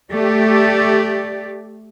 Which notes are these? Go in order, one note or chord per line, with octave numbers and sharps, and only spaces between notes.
A3 G4 D5